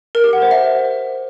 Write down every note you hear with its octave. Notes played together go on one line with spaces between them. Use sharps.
A#4
G4
F#5
C5
E5